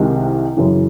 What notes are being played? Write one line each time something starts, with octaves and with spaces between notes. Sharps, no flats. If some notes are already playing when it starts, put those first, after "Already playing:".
Already playing: C2 C3 D#3 G#3
F#2 C#3 E3